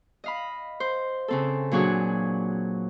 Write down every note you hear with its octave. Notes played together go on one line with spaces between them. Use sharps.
D#5 F5 B5
C5
C#3 C4 A4
A#2 F#3 D4 F#4 G#4 C#5